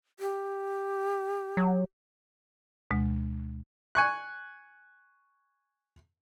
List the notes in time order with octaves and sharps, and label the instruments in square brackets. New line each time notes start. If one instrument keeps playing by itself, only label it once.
[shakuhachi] G4
[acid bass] F#3
[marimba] D2 B2 G#3
[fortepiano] G#5 C#6 F#6